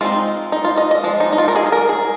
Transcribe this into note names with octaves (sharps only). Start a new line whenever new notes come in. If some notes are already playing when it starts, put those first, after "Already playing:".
G#3 C4 D#4 F4
D#4
F4
D#5
D#5
F3 G#3
D#4
D#4
F4
A#4
G#4
G#4
A#4
G#4